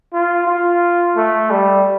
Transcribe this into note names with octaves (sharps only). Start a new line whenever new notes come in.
F4
F4
A3
G3